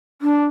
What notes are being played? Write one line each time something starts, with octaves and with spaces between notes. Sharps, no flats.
D4